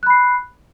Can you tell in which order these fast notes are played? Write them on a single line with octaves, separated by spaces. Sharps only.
F#6 B5 C7